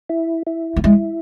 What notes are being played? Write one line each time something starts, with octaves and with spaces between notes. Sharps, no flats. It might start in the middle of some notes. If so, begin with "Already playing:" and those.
E4
E4
A#3
G#3 E4